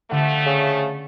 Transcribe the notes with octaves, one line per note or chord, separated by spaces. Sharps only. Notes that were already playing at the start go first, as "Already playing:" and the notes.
D3 F3 G3 A3 A4 F#5
C#3